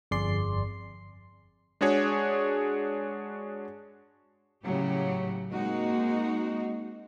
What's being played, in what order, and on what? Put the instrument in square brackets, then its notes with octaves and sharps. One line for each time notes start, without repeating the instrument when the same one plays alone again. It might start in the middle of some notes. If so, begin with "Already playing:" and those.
[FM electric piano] G1 F2 G#4 D5 C6 C7
[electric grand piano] G#3 D4 F#4 G#4 C#5
[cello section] A2 C#3 F#3 G4
G#3 A#3 C4 D#4 F#4